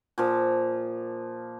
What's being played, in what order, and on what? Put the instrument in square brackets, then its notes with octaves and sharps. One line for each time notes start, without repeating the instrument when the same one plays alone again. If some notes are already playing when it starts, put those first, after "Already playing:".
[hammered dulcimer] A#2 F3